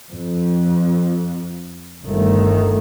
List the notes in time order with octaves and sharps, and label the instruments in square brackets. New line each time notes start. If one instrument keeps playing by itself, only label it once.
[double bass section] F2
G1 D#3 A3